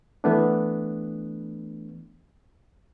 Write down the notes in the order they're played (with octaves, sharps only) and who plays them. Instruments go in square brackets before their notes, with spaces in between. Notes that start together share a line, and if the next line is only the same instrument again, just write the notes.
[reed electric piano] E3 A3 B3 D4